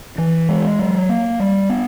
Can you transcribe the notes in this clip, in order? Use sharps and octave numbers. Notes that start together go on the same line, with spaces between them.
E3
G#3
F#3
A#3
G3
B3